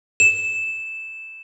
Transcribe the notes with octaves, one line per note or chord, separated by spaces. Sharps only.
E7